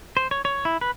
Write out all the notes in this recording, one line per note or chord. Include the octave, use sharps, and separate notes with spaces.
C5
C#5
C#5
E4
B4